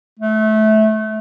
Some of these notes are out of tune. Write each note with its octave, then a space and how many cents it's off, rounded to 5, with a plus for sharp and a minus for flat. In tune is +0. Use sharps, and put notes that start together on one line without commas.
A3 -20